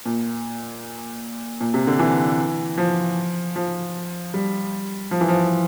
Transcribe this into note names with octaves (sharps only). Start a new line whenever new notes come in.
A#2
A#2
C3
D3
E3
F3
F3
G3
F3
E3
F3